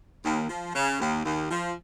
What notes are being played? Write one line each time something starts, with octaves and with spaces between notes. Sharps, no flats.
D#2
F3
C#3
D#2
D#2
F3